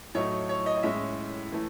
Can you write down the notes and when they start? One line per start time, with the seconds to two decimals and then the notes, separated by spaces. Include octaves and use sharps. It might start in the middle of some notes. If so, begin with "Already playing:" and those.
0.15 A2 F#3 A3 D#4 C#5
0.49 C#5
0.66 D#5
0.77 D#5
0.83 A2 G#3 C#4 E5
1.52 E3 A3